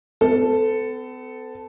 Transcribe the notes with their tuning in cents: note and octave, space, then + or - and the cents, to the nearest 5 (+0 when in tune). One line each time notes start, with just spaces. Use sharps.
B3 +45 A4 +0